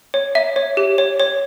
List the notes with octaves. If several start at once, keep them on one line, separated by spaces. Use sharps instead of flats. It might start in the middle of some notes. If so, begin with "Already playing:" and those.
C#5
E5
C#5
G4
C#5
C#5